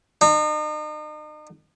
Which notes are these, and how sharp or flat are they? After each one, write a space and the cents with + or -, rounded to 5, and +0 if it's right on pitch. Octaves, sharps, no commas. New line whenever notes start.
D#4 -40